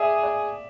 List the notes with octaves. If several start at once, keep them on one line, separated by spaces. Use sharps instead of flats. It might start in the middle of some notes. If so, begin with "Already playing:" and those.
Already playing: G#4 D5 E5
D5